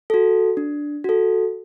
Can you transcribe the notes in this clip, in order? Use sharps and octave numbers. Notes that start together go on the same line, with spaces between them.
F#4 A4
D4
F#4 A4